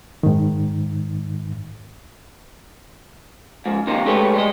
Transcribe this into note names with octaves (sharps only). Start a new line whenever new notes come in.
G#2 D#3
G#2 F3
D#2 C3 F3 A#3 D#4
G#3 A3 G4 B4 C#5
G3 G#3 D#5